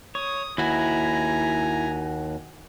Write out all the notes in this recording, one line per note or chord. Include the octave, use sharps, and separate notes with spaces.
C#5 D#6
D#2 E4 F#4 G#5 A#5